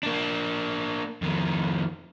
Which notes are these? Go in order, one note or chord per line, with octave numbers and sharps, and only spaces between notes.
A#3 D4
F2 D#3